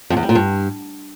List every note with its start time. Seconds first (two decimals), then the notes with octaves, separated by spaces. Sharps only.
0.10 F2
0.17 E2
0.23 G3
0.29 A#2
0.35 G2